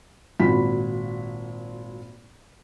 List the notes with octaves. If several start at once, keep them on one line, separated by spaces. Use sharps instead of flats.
G#1 A#2 F3 F#4 B5 B6